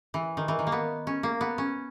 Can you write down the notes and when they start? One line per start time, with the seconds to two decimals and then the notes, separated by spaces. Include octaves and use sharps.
0.14 E3
0.37 D#3
0.48 E3
0.59 D#3
0.67 A#3
0.72 B3
1.07 C#4
1.23 A#3
1.41 B3
1.58 C#4